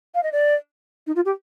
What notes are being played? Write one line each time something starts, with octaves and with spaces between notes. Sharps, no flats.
F5
D#5
D5
D#4
F4
G4